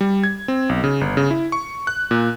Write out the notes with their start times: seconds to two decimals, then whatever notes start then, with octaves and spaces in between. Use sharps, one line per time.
0.01 G3
0.24 G#6
0.48 C4
0.69 B1
0.84 C#3
1.01 G1
1.17 C#3
1.31 E4
1.52 C#6
1.87 F#6
2.11 A#2